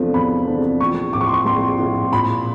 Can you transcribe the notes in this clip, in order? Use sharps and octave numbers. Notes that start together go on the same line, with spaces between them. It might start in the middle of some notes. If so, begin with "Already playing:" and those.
Already playing: E2 C3 F3 A3 D4
E2 B5
C3 F3 A3 D4
A#1 C#6
A2 F3 D6
C#6
C6
C#6
A#1 C6
A2 F3
A#2 B5